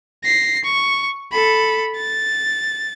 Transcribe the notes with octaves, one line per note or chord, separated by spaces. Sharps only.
A#6 C7
C#6
A4 B5
A6